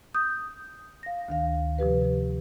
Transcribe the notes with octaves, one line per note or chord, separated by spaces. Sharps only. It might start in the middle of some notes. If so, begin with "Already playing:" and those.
D#6 G6
F5 A#6
D2 D#3 F5
C3 F3 G4 B4